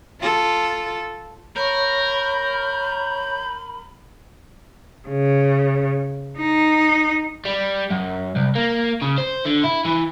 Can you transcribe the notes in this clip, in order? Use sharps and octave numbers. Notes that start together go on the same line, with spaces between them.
F4 A4
A#4 C#5 B5 C#6 G6
C#3
D#4
G3
F#2
C2
A#3
C#3
C5
D3
E4
E3